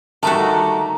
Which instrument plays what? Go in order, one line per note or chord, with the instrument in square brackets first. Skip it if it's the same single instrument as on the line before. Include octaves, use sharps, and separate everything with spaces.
[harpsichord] D2 G3 D6 [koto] D#3 A3 F#4 [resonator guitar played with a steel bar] A5 [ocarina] A#5